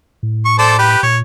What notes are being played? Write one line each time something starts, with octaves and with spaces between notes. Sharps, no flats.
A2
C#6
A4 C5 D5
G4 B4
A#2 C#5